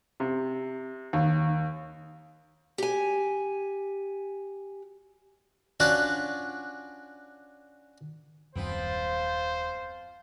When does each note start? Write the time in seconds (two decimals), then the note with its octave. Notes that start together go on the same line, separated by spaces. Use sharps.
0.20 C3
1.13 D#2
2.78 G4 G#5
5.80 C#4 D4 F4 F#4 D5 F#5
8.55 D#1 F#2 F3 B3 C4 C5